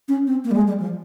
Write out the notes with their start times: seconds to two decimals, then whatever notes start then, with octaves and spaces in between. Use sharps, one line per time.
0.08 C#4
0.27 C4
0.44 A#3
0.51 G3
0.56 G#3
0.68 G3
0.80 F3